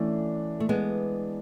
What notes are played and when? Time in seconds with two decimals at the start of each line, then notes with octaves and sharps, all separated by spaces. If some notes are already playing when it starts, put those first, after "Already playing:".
Already playing: E3 A3 C#4 D4
0.60 A3
0.69 G#3 B3